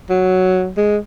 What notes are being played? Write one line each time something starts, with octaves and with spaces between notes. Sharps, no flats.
F#3
G#3